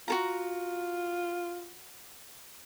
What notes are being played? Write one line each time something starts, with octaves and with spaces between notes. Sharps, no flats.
F4 F#4 A4 A#5